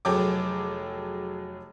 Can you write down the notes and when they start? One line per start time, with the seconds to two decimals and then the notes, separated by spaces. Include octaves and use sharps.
0.05 F1 F#3 G#4 A4 G5 D6